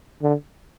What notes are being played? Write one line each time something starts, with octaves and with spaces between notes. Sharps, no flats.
D3